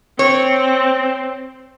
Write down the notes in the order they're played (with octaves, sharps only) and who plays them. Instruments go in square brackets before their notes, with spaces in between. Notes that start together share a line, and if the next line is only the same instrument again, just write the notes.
[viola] C4 [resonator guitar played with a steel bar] C#5